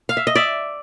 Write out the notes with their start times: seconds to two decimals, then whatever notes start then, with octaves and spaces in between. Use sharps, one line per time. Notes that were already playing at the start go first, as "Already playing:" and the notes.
0.09 F5
0.17 E5
0.27 D#5
0.35 D5 E5